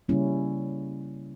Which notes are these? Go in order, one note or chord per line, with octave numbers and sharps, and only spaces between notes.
C#3 G3 A#3 C#4 E4